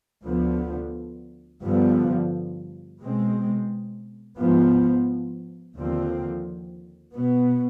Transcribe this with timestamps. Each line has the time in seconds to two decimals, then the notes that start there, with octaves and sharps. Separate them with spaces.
0.24 D2 D3 F3 B3
1.62 G2 D3 F3 B3
3.01 B2 G#3 C4
4.38 G#2 F3 B3
5.75 D#2 D3 F3 C4
7.15 B2 B3